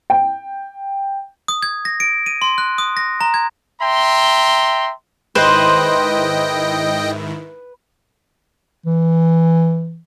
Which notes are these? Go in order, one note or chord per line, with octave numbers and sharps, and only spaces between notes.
G5
D#6
G#6
A#6
D7
D#7
C6
F#6
D#6
A#6
A#5
G#6
E5 G5 A#5 C6
G#2 D#3 E4 B4 C5 D#5 G5
E3